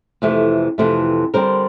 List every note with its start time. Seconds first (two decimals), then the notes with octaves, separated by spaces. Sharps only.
0.22 F2 C3 E3 A3
0.78 F2 C3 E3 A3
1.34 D3 G3 C4 A#4 C5